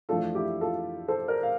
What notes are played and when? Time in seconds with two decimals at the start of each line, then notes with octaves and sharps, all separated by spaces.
0.09 F2 E3 A3 D4 F4 A4
0.35 E4 G4
0.61 F4 A4
1.08 A4 C5
1.28 A#4 D5
1.43 F5